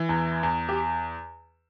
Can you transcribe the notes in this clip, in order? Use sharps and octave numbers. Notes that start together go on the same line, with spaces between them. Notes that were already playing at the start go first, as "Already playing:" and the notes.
Already playing: E3
E2
E2
G4